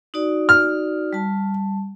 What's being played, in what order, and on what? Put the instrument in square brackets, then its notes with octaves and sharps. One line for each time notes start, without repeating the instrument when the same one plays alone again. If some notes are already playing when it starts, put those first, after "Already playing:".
[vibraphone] D#4 F#4 D5
[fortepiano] F6
[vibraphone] G3 A5